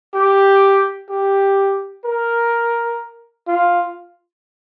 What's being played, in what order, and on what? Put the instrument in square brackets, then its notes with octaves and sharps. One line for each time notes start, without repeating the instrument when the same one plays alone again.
[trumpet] G4
G4
A#4
F4